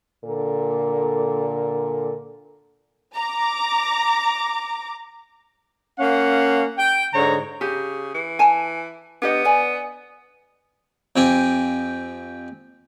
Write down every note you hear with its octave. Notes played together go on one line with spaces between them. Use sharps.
A#2 D3 A4 A#4
A#5 D6
A#3 C#4 F5 F#5
G5
G#2 D3 C#5 A#5
C#3 G4
E3
G#5 A5
B3 D4 G4 D#5
D5 G#5
F2 C4 G4 G#5